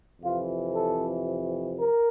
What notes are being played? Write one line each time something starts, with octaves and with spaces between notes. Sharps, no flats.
F2 C3 E3 F4
A4
A#4